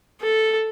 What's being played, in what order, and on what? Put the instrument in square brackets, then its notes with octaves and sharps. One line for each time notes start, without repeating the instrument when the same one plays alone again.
[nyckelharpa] A4